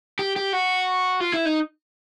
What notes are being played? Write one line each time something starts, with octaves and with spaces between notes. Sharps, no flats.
G4
G4
F#4
F4
E4
D#4